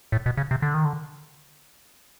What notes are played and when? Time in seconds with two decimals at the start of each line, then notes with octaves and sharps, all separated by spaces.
0.12 A2
0.26 B2
0.37 C#3
0.51 C3
0.62 D3
0.74 D#3
0.85 D3